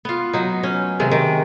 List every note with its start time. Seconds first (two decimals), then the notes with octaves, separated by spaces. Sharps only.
0.05 B3 F4
0.33 F#3 D#4
0.63 C#4
1.00 C3 D#3 G#3
1.11 D#3